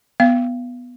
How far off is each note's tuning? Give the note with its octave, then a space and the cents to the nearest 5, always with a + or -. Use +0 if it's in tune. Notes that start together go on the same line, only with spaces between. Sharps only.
B3 +0 F5 -30